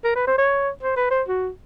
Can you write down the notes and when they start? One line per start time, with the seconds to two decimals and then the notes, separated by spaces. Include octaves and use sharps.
0.04 A#4
0.15 B4
0.27 C5
0.38 C#5
0.83 C5
0.96 B4
1.11 C5
1.28 F#4